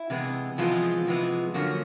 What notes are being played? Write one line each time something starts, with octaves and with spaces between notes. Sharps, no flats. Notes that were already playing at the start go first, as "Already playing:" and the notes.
Already playing: E4
C3 E3 G#3 B3
C3 E3 F3 G#3 B3 F4
C3 E3 G#3 B3
F#2 D3 F3 F#3 A#3 F#4